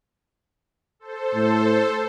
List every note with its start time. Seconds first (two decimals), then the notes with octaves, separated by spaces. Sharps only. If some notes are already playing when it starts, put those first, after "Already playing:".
1.00 A4 C5
1.34 A2